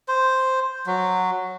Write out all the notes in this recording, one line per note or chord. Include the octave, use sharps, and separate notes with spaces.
C5
F#3